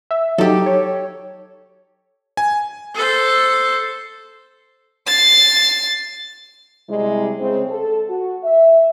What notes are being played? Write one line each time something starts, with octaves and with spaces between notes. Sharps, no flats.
E5
F#3 D#4 G4 A4
C#5
G#5
A4 C5
A6 C7
C3 G3 G#3 E4
C#3 G#3 C4
A4
F#4
E5